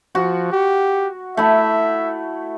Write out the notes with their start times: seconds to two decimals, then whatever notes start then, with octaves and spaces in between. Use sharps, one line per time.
0.15 F3 F#4
0.52 G4
1.37 A3 E4 E5